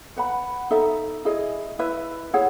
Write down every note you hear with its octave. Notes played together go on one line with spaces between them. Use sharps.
B4 F#5 B5
D#4 A4 E5
E4 G#4 D#5
E4 B4 E5
E4 G#4 C#5 F#5